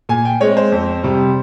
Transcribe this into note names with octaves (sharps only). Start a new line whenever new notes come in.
A#2 G#5
G5
G#3 C4 C#5
C5
F2
C3 G3